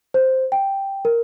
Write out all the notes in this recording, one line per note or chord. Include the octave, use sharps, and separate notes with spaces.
C5
G5
A#4